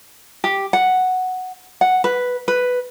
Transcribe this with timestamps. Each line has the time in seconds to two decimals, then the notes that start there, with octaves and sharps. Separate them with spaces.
0.44 G4
0.73 F#5
1.81 F#5
2.04 B4
2.48 B4